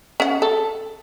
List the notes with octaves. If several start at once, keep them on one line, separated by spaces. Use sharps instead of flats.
C#4 F#5
A4